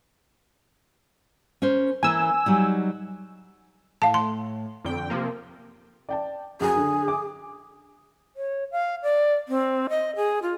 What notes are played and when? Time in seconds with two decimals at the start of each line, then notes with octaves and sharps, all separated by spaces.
1.62 C#4 A#4 C5
2.03 E3 A#3 A#4 G#5 E6
2.46 F#3 G3 D#4
4.02 A2 F5 A5
4.14 C6
4.84 F2 D3 G5
5.10 C3 F3 A#3
6.09 D5 G5 A5
6.60 F#2 F#3 G#4
6.77 D3
7.08 D6
8.36 C#5
8.72 F5
9.03 D5
9.48 C4
9.89 D#5
10.16 G#4
10.42 F4